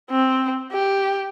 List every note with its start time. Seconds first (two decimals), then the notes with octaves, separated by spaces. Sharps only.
0.10 C4
0.72 G4